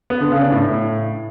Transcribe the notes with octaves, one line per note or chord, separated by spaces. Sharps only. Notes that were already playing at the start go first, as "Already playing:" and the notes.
B3
D3
C#3
D4
A2